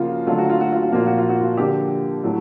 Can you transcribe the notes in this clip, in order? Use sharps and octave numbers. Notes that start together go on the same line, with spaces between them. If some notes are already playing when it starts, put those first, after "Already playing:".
Already playing: C#3 F3 A#3 F4 F#4
D3 F#3 A3 F4
F#4
F4
F#4
F4
F#4
A#2 F3 A#3 F4
F#4
F4
F#4
F4
D3 F3 A#3 G4
A2 F#3 A3